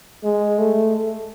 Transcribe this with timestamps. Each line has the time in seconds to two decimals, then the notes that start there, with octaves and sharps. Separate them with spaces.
0.24 G#3
0.59 A3